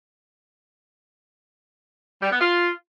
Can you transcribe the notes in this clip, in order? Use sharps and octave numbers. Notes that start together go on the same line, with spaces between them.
G3
B3
F4